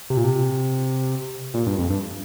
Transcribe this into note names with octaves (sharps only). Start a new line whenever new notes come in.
C3
A#2
C3
A#2
G2
F2
G2